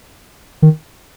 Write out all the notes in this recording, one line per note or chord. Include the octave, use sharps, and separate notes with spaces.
D#3